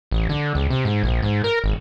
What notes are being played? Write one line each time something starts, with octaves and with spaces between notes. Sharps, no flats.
A1
D3
C#2
C3
G#2
A#1
G#2
A#4
G#1